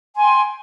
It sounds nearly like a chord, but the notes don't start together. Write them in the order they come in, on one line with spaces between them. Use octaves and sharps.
G#5 C6 G5